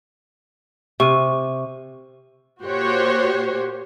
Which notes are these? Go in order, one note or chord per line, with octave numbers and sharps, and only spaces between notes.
C3 C#6 F6 D#7
A#2 F#4 G4 C5 C#5